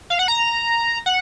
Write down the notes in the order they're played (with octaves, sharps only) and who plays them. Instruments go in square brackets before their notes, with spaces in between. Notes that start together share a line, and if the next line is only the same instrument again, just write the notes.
[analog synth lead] F5
F#5
A#5
F#5